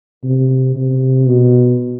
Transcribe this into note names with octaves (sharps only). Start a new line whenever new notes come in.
C3
C3
B2